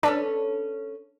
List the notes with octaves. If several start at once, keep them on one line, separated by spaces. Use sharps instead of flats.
C#4 D4 A4 B4